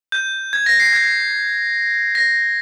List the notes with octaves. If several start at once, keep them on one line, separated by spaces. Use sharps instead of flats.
G6
G#6
A#6
C7
G#6
A#6